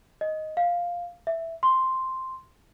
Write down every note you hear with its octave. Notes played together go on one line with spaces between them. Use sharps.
D#5
F5
E5
C6